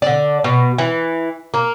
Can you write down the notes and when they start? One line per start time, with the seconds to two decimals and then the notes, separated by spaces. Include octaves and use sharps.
0.02 D3 D5
0.44 B2
0.78 E3
1.54 A#3